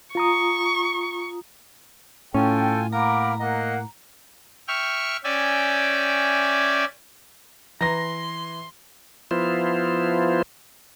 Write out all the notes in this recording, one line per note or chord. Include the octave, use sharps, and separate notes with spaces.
F4 A#5 C#6 D#6
A2 C#4 F4 A4 G5 G#5
A#3 A#4 F#5 A#5 B5 D6
A#3 D#5 F#5
E5 G5 C#6 F6
C#4 D5 E5 G5 G#5
E3 A#5 C6 A#6
F3 B3 E4 F4 C5